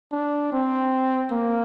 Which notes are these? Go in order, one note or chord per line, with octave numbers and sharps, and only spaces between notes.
D4
C4
A#3